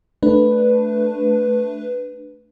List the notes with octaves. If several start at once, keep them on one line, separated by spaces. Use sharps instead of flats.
A3 D4 B4